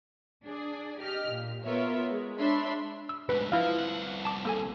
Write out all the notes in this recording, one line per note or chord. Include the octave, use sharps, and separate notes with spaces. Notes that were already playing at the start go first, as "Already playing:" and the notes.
D4 G#4 D5
G4 D#5 F6
A#2
B3 F4 A#4 B4 C#5 E5
G#3
D4 C#5 E5 B5 C6
E6
D2 G#2 B4
F3 E4 F5
C2 F#5
A5 D6
A#3 A4 G#5